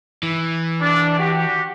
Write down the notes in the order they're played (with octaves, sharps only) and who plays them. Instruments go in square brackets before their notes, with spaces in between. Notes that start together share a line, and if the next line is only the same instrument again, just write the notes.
[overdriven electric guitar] E3
[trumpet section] D4
F#4 G4